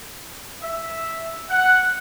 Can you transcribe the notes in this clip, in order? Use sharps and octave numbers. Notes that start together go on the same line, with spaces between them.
E5
F#5